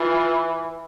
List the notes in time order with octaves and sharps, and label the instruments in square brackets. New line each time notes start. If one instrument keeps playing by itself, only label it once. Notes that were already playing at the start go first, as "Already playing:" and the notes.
Already playing: [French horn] E3 [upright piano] F4